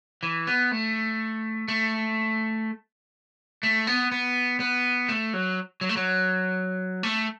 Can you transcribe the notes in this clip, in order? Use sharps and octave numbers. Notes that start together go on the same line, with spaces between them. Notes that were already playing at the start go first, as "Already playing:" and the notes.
E3
B3
A3
A3
A3
B3
B3
B3
A3
F#3
F#3
A3
F#3
A3